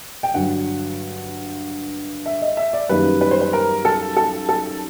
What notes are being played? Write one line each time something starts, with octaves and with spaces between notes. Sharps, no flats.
G5
G2 D3 F#3 F#5
E5
D#5
E5
D5
F#2 D#3 G3 A#3 B4
B4
C5
B4
A#4
A4
A4
A4